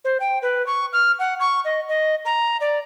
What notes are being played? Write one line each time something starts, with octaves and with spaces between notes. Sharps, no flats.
C5
G5
B4
C#6
F6
F#5
C#6
D#5
D#5
A#5
D5